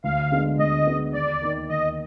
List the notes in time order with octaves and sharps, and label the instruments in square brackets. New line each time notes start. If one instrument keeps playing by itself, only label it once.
[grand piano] D2 [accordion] F5
[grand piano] D3 G#3 B3
[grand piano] D2 [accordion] D#5
[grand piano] D3 G#3 B3
[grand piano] D#2 [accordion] D5
[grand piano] D#3 A#3 D#4 A#4
[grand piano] D#2 [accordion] D#5